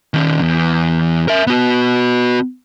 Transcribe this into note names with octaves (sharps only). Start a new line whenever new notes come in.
D#3 C#4
E2
A#4 E5
B3 F#4